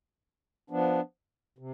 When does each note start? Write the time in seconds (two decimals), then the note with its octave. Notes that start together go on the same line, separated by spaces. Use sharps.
0.70 F3 B3 D4
1.58 C3